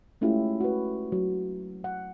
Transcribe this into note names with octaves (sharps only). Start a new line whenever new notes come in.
G#3 A3 C#4 E4 F4 G4
F#4 B4
F#3
F#5